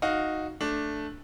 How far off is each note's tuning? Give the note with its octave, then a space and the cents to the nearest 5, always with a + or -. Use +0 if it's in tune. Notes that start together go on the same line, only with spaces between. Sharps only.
D#4 +0 F#4 -10 F5 +0
A3 +0 D4 +0